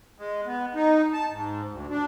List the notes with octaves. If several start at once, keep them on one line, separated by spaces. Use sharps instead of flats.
G#3
B3
D#4
A5
G#2
D2
D4